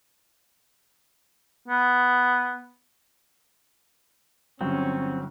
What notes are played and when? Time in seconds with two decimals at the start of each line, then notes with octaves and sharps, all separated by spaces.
1.68 B3
4.61 G1 G2 F#3 C4 C#4